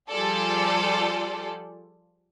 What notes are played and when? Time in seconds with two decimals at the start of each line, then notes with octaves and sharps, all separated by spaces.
0.10 F3 G3 F4 G#4 A4 D5